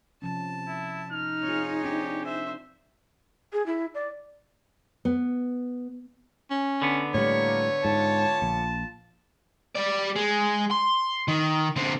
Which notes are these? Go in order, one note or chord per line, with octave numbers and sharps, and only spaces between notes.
C3 F3 C#4 A5
E4
D#4 F6
C4 F4 G#4 C#5
C4 D4 G4
C5 E5
G#4
E4
D5
B3
C#4
D3 B3
A2 G3 A#3 C#5
G#2 F4 A5
A#1
G3 D5
G#3
C6
D#3
D3 C4